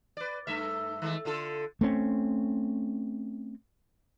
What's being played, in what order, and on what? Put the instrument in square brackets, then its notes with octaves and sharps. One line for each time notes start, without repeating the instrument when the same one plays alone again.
[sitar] B4 D5
G2 A3 E5
D#3 G#3 A3
D3 F4 A4
[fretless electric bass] A3 C4 C#4